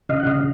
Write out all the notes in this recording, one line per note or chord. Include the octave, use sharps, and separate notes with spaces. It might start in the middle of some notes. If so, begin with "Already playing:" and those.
C#3 D#5 F5
F#5
C#3 D#5 F5